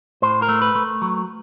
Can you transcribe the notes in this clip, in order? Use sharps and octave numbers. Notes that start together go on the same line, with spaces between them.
A2 C5
A#4
A3
B4
A3
F#3